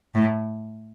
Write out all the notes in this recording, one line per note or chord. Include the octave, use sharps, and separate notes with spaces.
A2